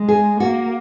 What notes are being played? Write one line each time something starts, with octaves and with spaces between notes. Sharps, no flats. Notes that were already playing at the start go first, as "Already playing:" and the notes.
Already playing: G#3
G#4
A#3 F#4